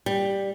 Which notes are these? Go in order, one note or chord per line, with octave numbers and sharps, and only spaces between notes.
G3